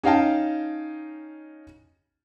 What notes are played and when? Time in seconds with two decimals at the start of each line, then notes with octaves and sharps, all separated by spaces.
0.03 C#4 D#4 F5 G5 A5